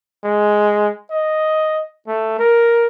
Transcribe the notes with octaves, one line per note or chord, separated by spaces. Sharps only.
G#3
D#5
A3
A#4